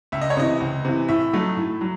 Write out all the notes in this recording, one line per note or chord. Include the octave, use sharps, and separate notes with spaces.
C#2 E5
D#5
C#5
C3 E3 D#5
C#2
C3 E3
A2 E5
F#3 A3 D#4
A2
F#3